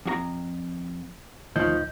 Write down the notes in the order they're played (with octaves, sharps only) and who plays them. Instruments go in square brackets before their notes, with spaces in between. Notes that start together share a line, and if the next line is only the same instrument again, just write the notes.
[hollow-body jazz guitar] F2 F#4 A#5
[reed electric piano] D2 D#5 G6 [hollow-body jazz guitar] A2 D#3 F3